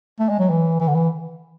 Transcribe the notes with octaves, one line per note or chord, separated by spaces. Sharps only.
A3
G#3
F#3
E3
E3
D3
E3